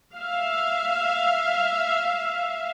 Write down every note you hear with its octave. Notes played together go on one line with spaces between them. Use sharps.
E5 F5